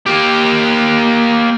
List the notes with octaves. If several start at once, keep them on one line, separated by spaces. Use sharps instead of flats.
A#3 G4